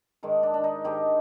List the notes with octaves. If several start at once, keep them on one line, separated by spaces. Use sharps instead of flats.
G#2 D#3 G#3 D4
D4
D4
D#4
G#2 D#3 G#3 D4 D#4 G4